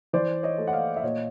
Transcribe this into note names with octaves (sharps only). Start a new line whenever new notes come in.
E3 C5 D5
C#5 D#5
A3
F#5
D#5 F5
E5
A#2 C#5 D#5